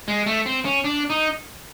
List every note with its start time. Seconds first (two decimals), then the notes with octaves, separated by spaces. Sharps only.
0.08 G#3
0.26 A3
0.46 C4
0.65 C#4
0.84 D4
1.10 D#4